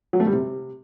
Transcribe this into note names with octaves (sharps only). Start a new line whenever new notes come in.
F#3
A3
G3
C3